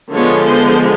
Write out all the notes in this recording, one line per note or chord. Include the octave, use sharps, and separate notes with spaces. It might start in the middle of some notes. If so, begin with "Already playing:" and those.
D3 F3 G#3 B3 C#5
C5